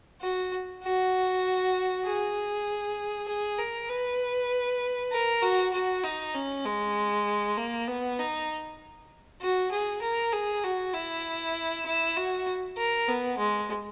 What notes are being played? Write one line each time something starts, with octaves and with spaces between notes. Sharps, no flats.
F#4
F#4
G#4
G#4
A#4
B4
A#4
F#4
F#4
D#4
C#4
G#3
A#3
B3
D#4
F#4
G#4
A#4
G#4
F#4
E4
E4
F#4
A#4
B3
G#3